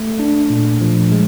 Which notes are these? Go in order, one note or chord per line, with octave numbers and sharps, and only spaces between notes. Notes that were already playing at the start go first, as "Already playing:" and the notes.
Already playing: A3
D4
A#2
F3
G#3